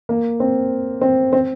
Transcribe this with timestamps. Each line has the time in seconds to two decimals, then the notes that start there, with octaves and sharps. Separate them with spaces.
0.09 A#3
0.40 C4
1.01 C4
1.33 C4